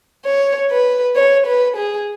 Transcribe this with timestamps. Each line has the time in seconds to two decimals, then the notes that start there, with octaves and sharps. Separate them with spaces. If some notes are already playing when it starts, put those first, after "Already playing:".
0.25 C#5
0.71 B4
1.16 C#5
1.46 B4
1.76 G#4